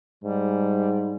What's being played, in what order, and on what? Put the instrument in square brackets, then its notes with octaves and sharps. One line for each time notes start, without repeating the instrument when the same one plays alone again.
[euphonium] G#2 [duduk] G3